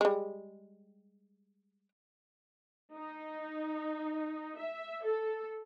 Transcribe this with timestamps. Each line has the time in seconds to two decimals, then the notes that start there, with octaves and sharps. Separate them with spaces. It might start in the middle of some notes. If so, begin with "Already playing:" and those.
0.01 G3 G#3
2.96 D#4
4.58 E5
5.04 A4